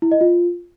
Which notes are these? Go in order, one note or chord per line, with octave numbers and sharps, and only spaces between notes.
E4
D#5
F4